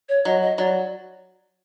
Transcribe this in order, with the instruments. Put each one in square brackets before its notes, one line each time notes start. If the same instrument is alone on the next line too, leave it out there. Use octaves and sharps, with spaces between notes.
[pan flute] C#5
[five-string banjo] F#3 [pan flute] D#5
[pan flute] D#5
[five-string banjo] F#3 [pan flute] D5